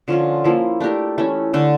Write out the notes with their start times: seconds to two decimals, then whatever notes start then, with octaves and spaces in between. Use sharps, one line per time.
0.08 D3 F3 C#4 F4
0.44 F3 A#3 E4
0.80 A3 D4 G4 A#4
1.18 E3 A3 C#4
1.54 D3 A3 D4